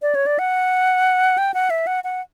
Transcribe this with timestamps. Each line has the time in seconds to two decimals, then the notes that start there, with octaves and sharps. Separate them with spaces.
0.02 D5
0.15 C#5
0.26 D5
0.39 F#5
1.38 G5
1.54 F#5
1.70 E5
1.87 F#5
2.04 F#5